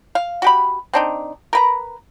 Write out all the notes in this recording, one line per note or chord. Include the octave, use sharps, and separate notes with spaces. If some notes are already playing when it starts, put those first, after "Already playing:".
F5
F#4 G4 B5
C4 D4 D#4
A#4 B4 A#5